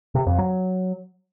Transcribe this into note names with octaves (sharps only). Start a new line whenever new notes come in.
C3
F2
F#3